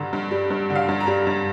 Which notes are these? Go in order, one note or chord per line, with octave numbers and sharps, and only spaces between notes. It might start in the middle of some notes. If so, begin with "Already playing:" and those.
Already playing: G2 D3 A#5
G2
G3
G2
D3
F5
G2
A#5
G3
G2